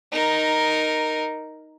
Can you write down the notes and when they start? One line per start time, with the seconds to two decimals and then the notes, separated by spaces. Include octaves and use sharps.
0.12 D#4 A#4